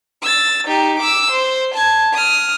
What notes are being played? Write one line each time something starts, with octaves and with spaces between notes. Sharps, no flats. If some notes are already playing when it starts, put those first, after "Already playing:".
E6 A6
D#4 G4
D6 E6
C5
A5 G#6
D#6 F6